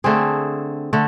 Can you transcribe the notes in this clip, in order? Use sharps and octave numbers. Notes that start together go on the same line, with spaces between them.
D3 A3 C4 G#4
D3 A3